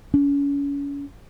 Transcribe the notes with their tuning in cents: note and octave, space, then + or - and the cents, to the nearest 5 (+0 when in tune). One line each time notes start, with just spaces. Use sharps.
C#4 +35